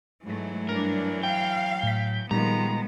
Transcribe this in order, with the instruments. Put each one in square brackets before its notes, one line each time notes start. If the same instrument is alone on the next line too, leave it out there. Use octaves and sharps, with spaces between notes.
[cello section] G#2 A3 [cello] E3 F#3
[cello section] G2 D4 [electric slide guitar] A#4
[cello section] F5 [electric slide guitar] G5
[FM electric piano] A2 B6
[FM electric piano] A#2 G3 [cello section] D#3 F3 G#3 [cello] B3 [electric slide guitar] A#5